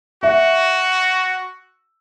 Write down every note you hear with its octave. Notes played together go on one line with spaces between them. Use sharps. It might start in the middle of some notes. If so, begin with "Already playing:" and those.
F#4 E5